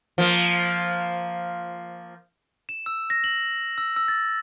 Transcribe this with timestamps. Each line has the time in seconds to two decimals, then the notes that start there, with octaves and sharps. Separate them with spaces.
0.18 F3 A#3
2.69 E7
2.86 E6
3.10 A#6
3.24 F#7
3.78 E6
3.96 E6
4.08 A6